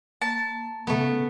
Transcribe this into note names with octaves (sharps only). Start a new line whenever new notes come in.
A#3 A5
C#3 A3 B3